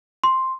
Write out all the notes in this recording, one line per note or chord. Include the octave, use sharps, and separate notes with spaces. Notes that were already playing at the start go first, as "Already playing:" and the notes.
C6